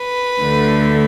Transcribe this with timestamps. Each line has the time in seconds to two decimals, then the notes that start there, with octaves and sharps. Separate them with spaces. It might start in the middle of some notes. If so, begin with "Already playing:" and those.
Already playing: B4
0.42 D2 D3 A3